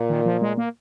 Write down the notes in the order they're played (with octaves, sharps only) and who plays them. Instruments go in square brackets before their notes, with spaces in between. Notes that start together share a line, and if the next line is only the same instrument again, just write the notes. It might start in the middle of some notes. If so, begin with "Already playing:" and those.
Already playing: [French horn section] A#2
[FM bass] D#3
F3
G#3
A#3